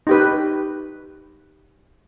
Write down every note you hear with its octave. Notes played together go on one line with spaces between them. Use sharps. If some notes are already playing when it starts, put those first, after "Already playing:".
D#4 G4 B4